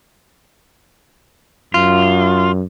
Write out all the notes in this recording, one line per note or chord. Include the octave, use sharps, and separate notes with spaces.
F#2 F4